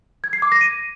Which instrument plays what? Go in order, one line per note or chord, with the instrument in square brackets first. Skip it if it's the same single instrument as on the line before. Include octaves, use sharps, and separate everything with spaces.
[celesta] G#6
C7
D6
A#6
D#7